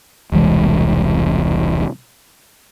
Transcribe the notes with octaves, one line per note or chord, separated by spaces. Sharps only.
E1 C2 E3 G#3